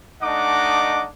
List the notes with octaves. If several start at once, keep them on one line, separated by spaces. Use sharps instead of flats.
A3 D4 D#4 D#5 F#5 D6